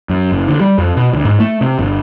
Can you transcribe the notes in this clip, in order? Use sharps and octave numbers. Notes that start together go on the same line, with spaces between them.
F#2
F#1
D3
G3
F2
B2
D2
G#2
A3
C3
G1